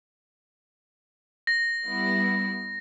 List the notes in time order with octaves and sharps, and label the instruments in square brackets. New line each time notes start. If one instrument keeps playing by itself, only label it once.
[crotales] A#6
[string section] G3 B3 E4